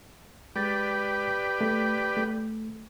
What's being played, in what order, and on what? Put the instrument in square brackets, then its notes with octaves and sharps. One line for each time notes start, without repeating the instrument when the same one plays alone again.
[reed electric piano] G#3 A6 [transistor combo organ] G4 B4 D5
[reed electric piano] A3
A3